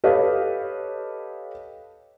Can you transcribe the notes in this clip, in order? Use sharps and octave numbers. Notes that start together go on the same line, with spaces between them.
G4 A4 B4 C#5 D#5 F5